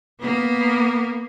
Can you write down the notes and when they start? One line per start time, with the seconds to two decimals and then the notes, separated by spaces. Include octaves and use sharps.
0.20 A#3 B3